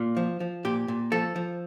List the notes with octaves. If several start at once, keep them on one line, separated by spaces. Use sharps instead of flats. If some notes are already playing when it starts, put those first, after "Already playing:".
Already playing: A#2 F4
F3
F3
A#2 G4
A#2
F3 A4
F3